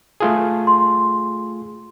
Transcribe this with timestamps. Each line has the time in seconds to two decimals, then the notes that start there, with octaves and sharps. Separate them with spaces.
0.20 A3 F4 G#4
0.67 C6